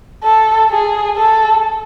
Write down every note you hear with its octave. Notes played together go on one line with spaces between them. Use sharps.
A4
G#4
A4